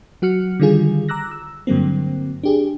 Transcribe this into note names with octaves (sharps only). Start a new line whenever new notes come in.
F#3 F#4 F6 C#7
D3 D#3 G3 F4 G#4
A#5 D6 E6 F#6 A#6
E6
G2 D3 F#3 A#3 C4
D4 G4 G#4